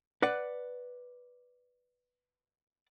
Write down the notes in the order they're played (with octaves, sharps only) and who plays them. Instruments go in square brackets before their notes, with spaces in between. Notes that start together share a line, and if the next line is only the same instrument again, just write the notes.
[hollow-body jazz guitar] B4 D5 F#5